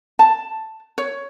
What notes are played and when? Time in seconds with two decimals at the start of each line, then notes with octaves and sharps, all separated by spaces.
0.19 A5
0.98 C#5